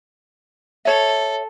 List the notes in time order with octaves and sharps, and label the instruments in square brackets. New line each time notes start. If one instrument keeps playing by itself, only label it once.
[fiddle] A4 [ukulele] C#5 E5